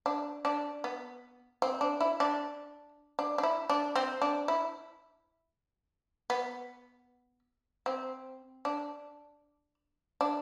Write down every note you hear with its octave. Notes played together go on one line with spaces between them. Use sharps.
D4
D4
B3
C4
D4
E4
D4
D4
D4
E4
D4
C4
D4
E4
B3
C4
D4
D4